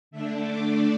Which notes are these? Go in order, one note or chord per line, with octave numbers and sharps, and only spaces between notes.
D3 A3 D4 E5
D5